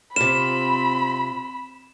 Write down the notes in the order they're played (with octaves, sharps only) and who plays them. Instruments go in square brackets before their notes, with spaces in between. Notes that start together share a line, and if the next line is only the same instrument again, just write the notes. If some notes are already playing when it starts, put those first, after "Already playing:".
[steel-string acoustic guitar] C3 F4 [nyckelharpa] C4 [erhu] B5 [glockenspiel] E7